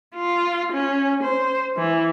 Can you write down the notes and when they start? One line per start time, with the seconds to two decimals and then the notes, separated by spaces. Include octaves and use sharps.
0.15 F4
0.72 C#4
1.23 C5
1.78 E3